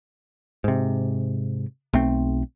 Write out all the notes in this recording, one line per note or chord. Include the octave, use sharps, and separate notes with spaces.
G#2 C3
B1 A3 C4